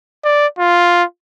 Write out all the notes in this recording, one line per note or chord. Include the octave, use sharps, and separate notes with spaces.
D5
F4